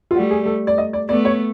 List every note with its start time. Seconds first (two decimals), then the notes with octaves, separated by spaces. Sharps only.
0.11 F4
0.15 G3 A3 F#4
0.30 G#4
0.46 A4
0.67 D5
0.78 D#5
0.93 D5
1.09 A3 B3 D5
1.25 C#5